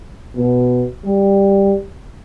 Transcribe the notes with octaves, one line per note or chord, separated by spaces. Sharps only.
B2
G3